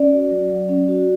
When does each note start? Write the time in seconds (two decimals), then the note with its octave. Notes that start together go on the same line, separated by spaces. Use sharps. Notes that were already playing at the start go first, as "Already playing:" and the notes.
Already playing: C#4 D5
0.13 F#4
0.31 F#3
0.50 F#3
0.69 C#4
0.88 F#4